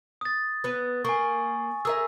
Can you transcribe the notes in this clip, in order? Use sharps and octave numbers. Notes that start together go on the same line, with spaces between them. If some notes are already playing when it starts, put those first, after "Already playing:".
D#6 A6
B3 B4
A#3 G#5 C#6
G#4 A#4 E5 E6